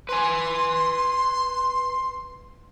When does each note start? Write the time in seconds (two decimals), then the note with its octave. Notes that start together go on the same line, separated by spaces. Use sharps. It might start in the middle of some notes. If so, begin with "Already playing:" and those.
0.09 B4 G#5 C6